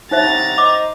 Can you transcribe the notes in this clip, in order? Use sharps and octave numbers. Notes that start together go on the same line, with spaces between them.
C2 C#4 D#4 C5 E5 F#5 A#5 A6
C5 D#5 D6